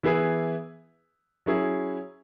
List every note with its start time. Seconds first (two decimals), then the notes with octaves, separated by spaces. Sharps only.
0.03 E3 B3 E4 G#4 B4
1.46 F#3 C#4 E4 G#4